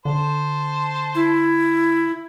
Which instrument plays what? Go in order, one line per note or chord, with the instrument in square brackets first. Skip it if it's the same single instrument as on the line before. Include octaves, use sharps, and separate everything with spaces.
[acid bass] D3 [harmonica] C5 A5
[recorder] E4